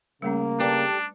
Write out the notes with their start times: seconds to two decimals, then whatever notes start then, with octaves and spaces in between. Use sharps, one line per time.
0.22 C#3 G3 A3 A#3 C#4
0.60 D4 G4 A4 B4 D5 A5